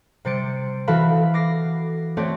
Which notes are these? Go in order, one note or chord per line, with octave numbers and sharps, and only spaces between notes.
C3 G3 C5 A6 C#7 D7
E3 F#4 A4 F5 B5
D6 A#6 C7
A3 C4 F#4 C#5 D5